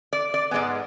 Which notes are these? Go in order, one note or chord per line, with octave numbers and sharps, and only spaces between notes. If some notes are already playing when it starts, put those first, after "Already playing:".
D5
D5
G#2 G#3 B3 D5